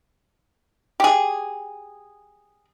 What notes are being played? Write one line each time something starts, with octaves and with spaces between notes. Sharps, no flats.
G4 G#4